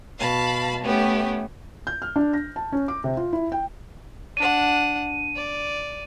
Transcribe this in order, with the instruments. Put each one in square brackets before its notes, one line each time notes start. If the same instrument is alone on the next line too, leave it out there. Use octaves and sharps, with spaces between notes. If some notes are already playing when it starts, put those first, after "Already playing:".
[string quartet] B2 F5 A5 B5
A3 B3 C#4 G4
[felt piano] G6
F6
D4
A#6
A5
C#4
D6
C3
F4
E4
G5
[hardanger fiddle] D4 F#5 [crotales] D#7
[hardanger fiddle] D5